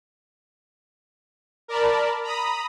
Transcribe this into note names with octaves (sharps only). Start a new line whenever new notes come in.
A#4 D5 A5 B5
A#5 B5 D#6